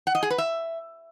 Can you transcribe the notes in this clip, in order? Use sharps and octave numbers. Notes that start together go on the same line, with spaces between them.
F#5
D#5
G#4
B4
E5